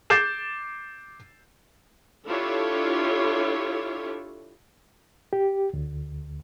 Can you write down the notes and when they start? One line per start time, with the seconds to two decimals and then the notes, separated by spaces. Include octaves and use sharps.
0.10 D6 G6 A6 C7 E7
2.28 D4 E4 F4 G4 A4 C#5
5.33 G4
5.73 D2